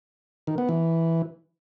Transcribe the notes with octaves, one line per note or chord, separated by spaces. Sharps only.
D#3
B3
E3